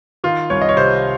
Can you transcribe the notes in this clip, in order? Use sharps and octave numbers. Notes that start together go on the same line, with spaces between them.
D#3 F4
C2 C#5
D#5
C#5
C3 C5